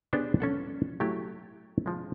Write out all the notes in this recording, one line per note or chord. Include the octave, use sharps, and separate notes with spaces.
B3 D4 G4 G#4 C5 C#5
C#4 A4 F#5
F#3 A3 E4 G4
F3 G#3